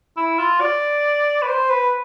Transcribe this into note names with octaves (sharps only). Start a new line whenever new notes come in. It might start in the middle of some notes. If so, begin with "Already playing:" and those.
E4
F4
D5
B4
C5
B4